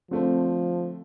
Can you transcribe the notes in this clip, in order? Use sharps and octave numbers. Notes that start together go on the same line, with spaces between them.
D3 F3 A3 C4